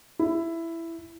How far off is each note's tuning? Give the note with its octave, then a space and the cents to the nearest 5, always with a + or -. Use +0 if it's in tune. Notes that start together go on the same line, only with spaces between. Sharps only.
E4 +10